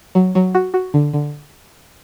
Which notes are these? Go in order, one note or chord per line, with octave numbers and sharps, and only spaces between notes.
F#3
F#3
F#4
F#4
D3
D3